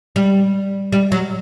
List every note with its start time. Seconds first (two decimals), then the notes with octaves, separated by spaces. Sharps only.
0.16 G3
0.92 G3
1.12 F#3